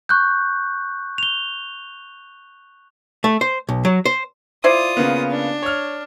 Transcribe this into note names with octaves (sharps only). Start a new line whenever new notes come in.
C#6 F#6 G6
F7 G7
A3
C5
B1
F#3
C5
E4 F4 C5 D5 D#6
C#3 A#3 B3
D4
C#5 F6